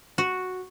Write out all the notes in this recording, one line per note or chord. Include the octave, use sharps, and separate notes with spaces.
F#4